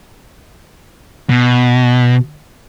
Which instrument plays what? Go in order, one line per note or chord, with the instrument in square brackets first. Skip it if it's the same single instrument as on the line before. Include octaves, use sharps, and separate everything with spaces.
[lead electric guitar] B2